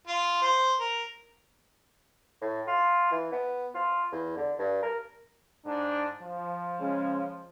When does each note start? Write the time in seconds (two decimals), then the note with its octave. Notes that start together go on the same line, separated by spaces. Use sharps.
0.07 F4
0.42 C5
0.80 A#4
2.42 A2
2.67 F4
3.12 E3
3.32 B3
3.74 F4
4.12 E2
4.37 D3
4.59 G2
4.82 A#4
5.66 G#2 D4
6.22 F3
6.79 C#3 G#3 C#4